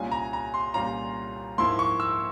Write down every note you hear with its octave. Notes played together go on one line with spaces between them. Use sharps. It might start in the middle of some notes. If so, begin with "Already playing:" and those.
Already playing: C2 A#2 G3 C#4 F4 G#5
A#5
A#5
C6
C2 A#2 G3 C#4 F4 A#5
G#2 F3 A#3 E4 C6
C#6
E6